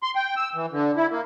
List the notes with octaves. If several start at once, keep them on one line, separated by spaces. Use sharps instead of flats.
C6
G5
E6
E3
D3
E4
A#3